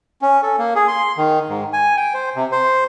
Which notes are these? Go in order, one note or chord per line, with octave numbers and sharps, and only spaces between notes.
C#4
A4
A#3
G#4
C6
D#3
G#2
G#5
G5
C5
C3
C5